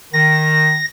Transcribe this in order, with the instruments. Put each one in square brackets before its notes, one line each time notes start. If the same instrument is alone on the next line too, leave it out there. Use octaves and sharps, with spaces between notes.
[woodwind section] D#3 [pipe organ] A#6